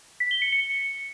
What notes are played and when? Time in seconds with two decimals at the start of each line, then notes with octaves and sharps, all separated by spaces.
0.20 B6
0.31 G7
0.42 C#7
0.52 C#7